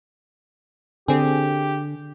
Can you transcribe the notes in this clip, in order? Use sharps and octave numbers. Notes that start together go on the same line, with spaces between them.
D3 C4 G4 G#4